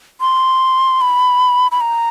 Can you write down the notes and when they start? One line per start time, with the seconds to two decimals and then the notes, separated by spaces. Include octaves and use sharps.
0.21 C6
1.01 B5
1.72 B5
1.81 A#5